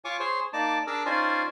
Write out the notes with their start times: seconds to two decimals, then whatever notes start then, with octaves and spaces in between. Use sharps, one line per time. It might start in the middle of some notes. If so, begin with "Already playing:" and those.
0.05 F4 C#5 G#5 C#6 D6
0.20 G#4 C5 C#5
0.53 A#3 D#4 D5 A5 D6
0.87 D4 G#4 A#4 D6 E6
1.06 C#4 D#4 F4 C5 D5 G#5